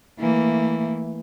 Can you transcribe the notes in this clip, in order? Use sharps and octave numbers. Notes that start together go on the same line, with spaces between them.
E3 A3 A#3